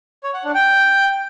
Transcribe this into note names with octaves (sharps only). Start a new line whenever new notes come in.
C#5
F#5
D4
G5